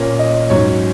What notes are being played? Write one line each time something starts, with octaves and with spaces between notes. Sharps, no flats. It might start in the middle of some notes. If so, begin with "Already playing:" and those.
Already playing: A#2 A#3 C#4
D#5
G#2 F#3 C#4 C#5